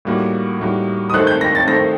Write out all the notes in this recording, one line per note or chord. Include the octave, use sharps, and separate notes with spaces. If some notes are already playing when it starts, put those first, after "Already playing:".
A2 G3 A#3 D#4 F#4
A2 G3 A#3 D#4 F#4
D#6
D#3 A3 D#4 A4 C5 F#6
G6
A#6
A6
D#3 A3 D#4 A4 C5 A#6